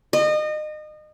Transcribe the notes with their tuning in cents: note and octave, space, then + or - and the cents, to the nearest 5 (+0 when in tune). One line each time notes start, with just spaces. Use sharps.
D#5 -30